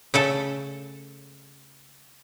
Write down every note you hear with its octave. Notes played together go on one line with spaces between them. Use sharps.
C#3 A3 A4